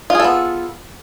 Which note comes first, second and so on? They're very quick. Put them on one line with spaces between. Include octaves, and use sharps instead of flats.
F4 G#4 A4 B3